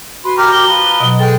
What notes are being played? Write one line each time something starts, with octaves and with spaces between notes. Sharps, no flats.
F#4 B4 C6
G4 A#4 A#5 F6
G7
F3 B4 A#5
B2 F#3 D#5
G#3 G#4 A4 G5